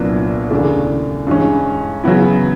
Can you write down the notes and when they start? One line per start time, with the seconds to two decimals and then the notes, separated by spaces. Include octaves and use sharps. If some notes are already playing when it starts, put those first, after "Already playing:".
Already playing: C2 A#2 F#3 B3 D4
0.51 D#2 C#3 E3 A3 D4
1.27 G2 E3 G#3 C#4
2.04 C#3 F#3 B3 E4